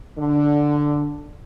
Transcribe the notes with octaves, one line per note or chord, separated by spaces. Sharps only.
D3